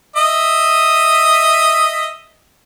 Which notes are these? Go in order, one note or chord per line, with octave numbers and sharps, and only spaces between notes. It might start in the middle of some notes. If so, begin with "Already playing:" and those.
D#5 E5 D#6